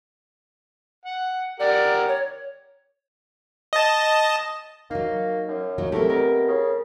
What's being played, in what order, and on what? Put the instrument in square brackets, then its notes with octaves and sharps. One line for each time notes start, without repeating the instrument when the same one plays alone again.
[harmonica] F#5
[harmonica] G4 A#4 F#5 [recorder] D5
[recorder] C#5
[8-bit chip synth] D#5 A5
[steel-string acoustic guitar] F#3 D#4 [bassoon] A#3
[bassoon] F#2
[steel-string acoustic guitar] F#3 A#3 D#4
[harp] A3 A#4 [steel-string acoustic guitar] C4 E4 G4
[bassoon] B2 [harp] A#4
[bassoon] C#3